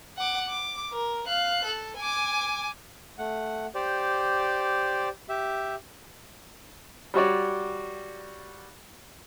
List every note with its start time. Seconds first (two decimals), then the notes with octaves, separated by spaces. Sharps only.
0.18 F#5 D6
0.49 D6
0.92 A#4
1.27 F5 F#6
1.64 A4
1.97 G#5 D6
3.18 A3 F#5
3.75 G4 C5 D5
5.29 G4 E5
7.14 G3 F#4 C#5 D5